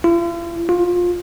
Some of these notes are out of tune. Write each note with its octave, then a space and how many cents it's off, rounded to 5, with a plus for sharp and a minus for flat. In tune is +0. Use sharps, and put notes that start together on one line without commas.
F4 -45
F4 +20